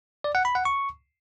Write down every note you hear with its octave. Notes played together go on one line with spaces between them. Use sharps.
D5
F#5
B5
F#5
C#6